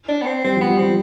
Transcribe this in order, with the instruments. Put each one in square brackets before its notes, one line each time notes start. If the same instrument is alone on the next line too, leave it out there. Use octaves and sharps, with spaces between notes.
[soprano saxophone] D4
B3
C4
[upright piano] G3 [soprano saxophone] C4
[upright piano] F3 [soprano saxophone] B3
[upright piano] G3
[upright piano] F3 [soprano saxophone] C4